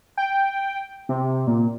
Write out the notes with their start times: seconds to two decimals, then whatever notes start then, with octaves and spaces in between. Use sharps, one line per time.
0.17 G5
1.09 C3
1.47 A#2